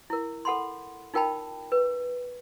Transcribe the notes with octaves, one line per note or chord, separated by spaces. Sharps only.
E4 A#4
A4 F#5 B5 C6
D#4 F4 A#4 G5 A5 B5
B4